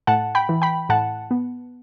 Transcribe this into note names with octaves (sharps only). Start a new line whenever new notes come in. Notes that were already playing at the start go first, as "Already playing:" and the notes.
A2 F#5 A5
G5 B5
E3
G5 B5
A2 F#5 A5
B3